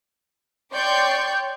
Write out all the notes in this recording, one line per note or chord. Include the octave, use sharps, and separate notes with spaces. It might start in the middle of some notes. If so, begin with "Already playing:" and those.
C#5 D5 G5 C6 C#6 G6